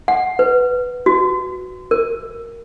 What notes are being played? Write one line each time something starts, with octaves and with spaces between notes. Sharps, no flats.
F#5
B4
F#4
A#4